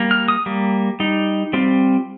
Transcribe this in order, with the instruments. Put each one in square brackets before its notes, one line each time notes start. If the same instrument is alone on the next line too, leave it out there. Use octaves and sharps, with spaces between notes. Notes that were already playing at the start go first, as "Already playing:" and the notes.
Already playing: [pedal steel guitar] G3 A#3
F6
D#6
G3 A#3
G3 D#4
G3 C4 F4